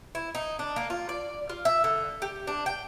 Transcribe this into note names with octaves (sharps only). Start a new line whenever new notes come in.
E4
D#4
D4
A#3
F4
D5
F4
E5
D3
G4
D4
G5